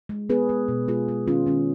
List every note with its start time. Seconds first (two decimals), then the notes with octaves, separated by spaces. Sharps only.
0.09 G#3
0.29 B3 G#4 B4
0.49 G#3
0.68 B2
0.88 G#3 F4 G#4
1.08 G#3
1.27 D#3 C#4 F4
1.46 D#3 C#4